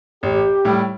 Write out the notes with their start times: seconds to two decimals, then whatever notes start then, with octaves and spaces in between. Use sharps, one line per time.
0.23 A1 G4
0.65 A2 G3